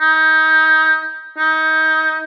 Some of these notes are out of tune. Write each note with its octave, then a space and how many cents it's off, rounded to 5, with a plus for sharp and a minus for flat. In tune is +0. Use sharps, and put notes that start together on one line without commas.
D#4 +25
D#4 +25